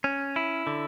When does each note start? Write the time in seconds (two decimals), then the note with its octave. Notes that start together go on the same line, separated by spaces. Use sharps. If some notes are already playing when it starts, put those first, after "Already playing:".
0.04 C#4
0.36 E4
0.67 D3